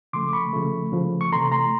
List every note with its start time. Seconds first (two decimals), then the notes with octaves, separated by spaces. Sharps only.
0.13 C#3 F3 A3 C6 D6
0.33 B5 C#6
0.53 C#3 F3 A3
0.92 C#3 F3 A3
1.21 C#6
1.32 C3 E3 A3 A#5 C6
1.52 A#5 C6